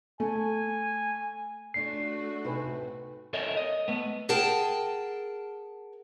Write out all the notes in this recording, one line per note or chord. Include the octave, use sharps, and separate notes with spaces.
A3 G#5
A3 C#4 D4 F4 F#4 C7
A2 C3 D#4 B4 G#5
A4 A#4 C#5 D#5 E5
D#5
A3 B3
G#4 A#4 F#5 G5 A5